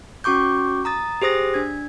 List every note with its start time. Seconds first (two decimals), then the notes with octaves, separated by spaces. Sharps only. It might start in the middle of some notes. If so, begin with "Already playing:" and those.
0.24 C#4 F#4 C#6 D6 G6
0.85 A#5 D#6 A6
1.22 G4 G#4 C5 D#6 A#6
1.54 D4 G#6